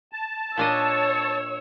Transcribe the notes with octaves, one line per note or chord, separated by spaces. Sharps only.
A5
A#2 D4 C#5 D#5 E6